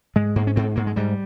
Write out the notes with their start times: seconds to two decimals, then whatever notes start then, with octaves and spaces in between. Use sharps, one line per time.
0.16 G#2 G#3
0.36 G#2 A#3
0.47 C#4
0.56 G#2 C4
0.76 G#2 A#3
0.87 G#3
0.96 G#2 G3